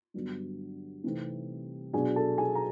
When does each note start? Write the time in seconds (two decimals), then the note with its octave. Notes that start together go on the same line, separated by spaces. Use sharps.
0.14 G2 D3 F#3 B3
1.04 C3 E3 A3 C4 D#4
1.93 B2 F#3 B3 D4 G#4 G#5
2.16 A4 A5
2.38 G#4 G#5
2.55 A#5